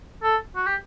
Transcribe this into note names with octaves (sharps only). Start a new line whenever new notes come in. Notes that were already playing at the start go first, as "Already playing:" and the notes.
A4
F#4
G4